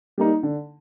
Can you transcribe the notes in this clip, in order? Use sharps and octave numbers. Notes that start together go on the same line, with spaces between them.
G3 A#3 D#4
D3